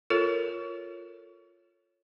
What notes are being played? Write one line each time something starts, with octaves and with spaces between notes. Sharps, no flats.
F4 A4 A#4 C#5